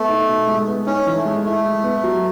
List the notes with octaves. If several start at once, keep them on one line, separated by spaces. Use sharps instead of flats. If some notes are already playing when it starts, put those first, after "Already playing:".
Already playing: A3 B3
D#4
B2
G#3
B3
C#4 D#4
E3
A3
G#3
A3 E4
G#3
B3
F#3